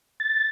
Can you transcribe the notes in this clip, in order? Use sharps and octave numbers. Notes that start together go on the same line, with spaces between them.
A6